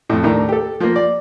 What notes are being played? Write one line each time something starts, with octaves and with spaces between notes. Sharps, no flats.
F2 A2
D#2 A2 D4 A#5
G4 A4
F3 A#3
D5